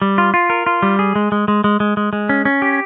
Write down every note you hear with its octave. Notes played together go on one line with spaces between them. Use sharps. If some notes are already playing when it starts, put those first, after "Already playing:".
G3
F4
F4
A#4
F4
G3
G#4
G#3
G#3
G#3
G#3
G#3
G#3
G#3
C#4
C#4
G4